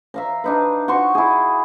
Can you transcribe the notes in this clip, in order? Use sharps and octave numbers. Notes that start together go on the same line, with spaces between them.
E5 F5 A#5
D4 D#4 B4
F#4 C6 C#6
E4 G#4